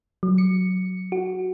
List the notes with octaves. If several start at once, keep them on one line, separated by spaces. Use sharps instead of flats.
F#3
C#7
F#4